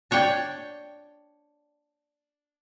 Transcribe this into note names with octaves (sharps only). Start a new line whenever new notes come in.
D4 C#5 D5 G5